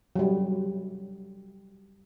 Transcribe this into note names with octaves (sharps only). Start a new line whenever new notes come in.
F#3 G3